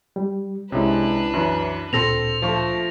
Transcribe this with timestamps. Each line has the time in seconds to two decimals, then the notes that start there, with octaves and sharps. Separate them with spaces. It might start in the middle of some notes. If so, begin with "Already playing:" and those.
0.16 G3
0.72 C2 C3 G#3 C#4 D4 E4 B4
1.33 F#2 E3
1.93 D2 A#2 C4 A4 C6 A#6 F7
2.42 F3 A3 F4 C#6